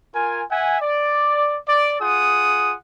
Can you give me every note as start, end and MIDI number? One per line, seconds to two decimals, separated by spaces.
0.15 0.43 65
0.15 0.43 70
0.15 0.43 80
0.51 0.78 76
0.51 0.78 78
0.51 0.78 80
0.81 1.57 74
1.68 1.96 74
2.01 2.75 65
2.01 2.75 68
2.01 2.75 78
2.01 2.75 87